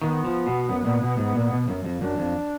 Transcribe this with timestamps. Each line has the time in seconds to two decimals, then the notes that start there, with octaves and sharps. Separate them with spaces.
0.02 D#3 B3
0.24 F3
0.46 B2
0.69 F#2
0.85 A#2
1.02 B2
1.17 G#2
1.35 A#2
1.51 B2
1.68 F#2
1.84 F2
2.01 F#2 D4
2.18 F2